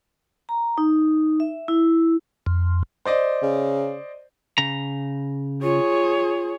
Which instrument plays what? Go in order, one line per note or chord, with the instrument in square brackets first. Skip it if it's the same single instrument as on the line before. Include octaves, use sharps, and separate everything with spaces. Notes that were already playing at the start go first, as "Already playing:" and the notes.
[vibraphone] A#5
D#4
E5
E4
[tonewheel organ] F2
[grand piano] C5 D5 D#5
[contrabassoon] C#3
[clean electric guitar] C#3 A#5
[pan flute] F4 [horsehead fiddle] G#4 C#5